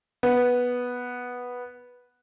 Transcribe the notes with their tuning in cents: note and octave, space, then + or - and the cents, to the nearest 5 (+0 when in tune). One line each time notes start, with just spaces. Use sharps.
B3 -5